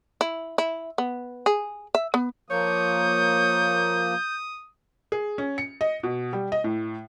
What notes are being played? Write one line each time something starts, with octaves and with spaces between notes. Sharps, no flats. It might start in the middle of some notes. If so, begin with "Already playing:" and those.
E4
E4
B3
G#4
E5
B3
F3 A#3 C#5 D#6 G6
G#4
C#4
C#7
D#5
B2
G3
D#5
A2